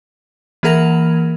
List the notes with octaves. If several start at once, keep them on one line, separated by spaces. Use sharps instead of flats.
E3 A#3 G#4 A#4 F#5 G#6